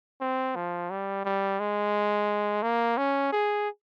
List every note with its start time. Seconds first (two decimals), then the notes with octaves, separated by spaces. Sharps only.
0.21 C4
0.56 F3
0.91 G3
1.25 G3
1.60 G#3
2.63 A#3
2.98 C#4
3.33 G#4